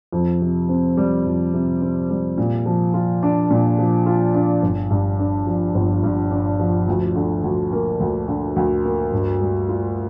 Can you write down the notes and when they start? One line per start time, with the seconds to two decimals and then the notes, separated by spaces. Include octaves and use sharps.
0.13 F2
0.41 C3
0.69 C4
0.97 G3
1.25 F2
1.54 C3
1.82 C4
2.10 G3
2.38 A#2
2.66 F3
2.94 F4
3.23 D4
3.50 A#2
3.79 F3
4.06 F4
4.35 D4
4.63 G1
4.90 G2
5.19 D4
5.47 F3
5.75 G1
6.03 G2
6.31 D4
6.60 F3
6.88 D2
7.16 D3
7.44 D2
7.72 A#3
8.00 D2
8.28 D3
8.56 D2
8.85 A#3
9.12 G2
9.41 G3
9.69 F4